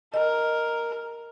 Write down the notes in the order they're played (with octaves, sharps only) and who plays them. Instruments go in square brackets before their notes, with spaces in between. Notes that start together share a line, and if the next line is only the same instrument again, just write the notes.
[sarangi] A#4 [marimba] D#5